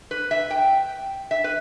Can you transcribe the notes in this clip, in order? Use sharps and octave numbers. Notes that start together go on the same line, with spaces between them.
B4
E5
G5
E5
B4